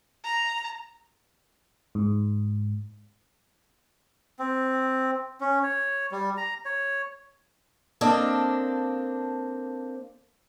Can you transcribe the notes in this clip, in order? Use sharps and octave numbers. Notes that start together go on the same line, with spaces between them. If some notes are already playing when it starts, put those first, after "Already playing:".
A#5
G#2
C4
C#4
C#5
G3
A#5
C#5
A#3 C4 D4 A4 D5 D#5